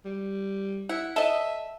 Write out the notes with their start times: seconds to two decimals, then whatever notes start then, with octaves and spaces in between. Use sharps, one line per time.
0.05 G3
0.89 E4 F#5
1.16 A4 D#5 E5